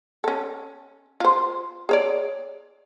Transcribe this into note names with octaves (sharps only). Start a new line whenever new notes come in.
C#4 A4
F4 C5
G#4 C#5 D5